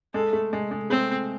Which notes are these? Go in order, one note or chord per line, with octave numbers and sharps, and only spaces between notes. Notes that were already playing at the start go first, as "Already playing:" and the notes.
G#3 A4
A3
G#3
G#3
A3 C4